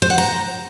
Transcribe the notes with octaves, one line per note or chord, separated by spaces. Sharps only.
C5
F#5
A#5